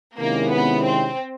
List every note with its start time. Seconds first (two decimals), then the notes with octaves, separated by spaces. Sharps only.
0.19 C3 D#3 G#3 A#3 C#4 E4
0.52 B3
0.85 C4